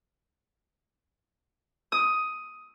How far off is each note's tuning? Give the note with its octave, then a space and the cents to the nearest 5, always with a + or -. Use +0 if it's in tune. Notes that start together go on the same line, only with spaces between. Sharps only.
D#6 +10